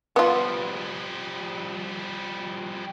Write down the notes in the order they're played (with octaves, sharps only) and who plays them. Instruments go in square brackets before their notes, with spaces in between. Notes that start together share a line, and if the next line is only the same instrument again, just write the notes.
[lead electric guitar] F3 G3 [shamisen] B3 F4